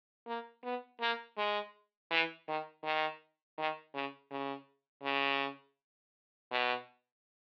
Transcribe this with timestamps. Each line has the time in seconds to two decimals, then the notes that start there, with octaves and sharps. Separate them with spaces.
0.27 A#3
0.64 B3
1.01 A#3
1.37 G#3
2.11 E3
2.48 D#3
2.83 D#3
3.58 D#3
3.94 C#3
4.31 C#3
5.03 C#3
6.51 B2